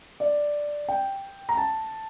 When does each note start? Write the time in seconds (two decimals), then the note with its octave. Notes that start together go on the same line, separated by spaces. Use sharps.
0.20 D5
0.89 G5
1.49 A#5
1.57 A5